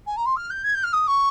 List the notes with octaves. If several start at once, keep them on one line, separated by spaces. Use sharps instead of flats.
G#5
A#5
C6
F6
G6
G#6
G6
F6
D#6
C#6